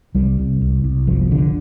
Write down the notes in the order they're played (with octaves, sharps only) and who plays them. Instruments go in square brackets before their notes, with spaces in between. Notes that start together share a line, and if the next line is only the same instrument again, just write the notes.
[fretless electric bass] C2 G3
C2
C2
C2
G1 F3
D3